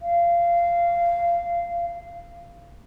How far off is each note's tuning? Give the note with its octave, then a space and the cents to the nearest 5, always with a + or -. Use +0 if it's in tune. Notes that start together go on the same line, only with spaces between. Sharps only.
F5 -20